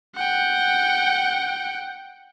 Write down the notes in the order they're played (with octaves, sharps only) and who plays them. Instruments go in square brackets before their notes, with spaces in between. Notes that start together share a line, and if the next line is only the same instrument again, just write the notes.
[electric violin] F#5 G5